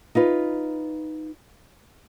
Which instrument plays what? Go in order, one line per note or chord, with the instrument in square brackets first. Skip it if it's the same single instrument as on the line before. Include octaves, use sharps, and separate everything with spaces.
[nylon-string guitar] D#4 F4 B4